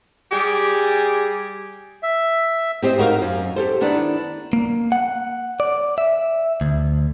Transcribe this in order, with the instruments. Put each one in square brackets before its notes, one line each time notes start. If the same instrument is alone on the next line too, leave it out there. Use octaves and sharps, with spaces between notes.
[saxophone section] G3 G4 G#4
[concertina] E5
[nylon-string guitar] C4 G4 C5 D#5
D#4 F#4 A#4 C5 F5
F#2
G4 A4 C5
D#3 B3 D4 E4
[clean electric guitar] A#3
F#5
D5
E5
D2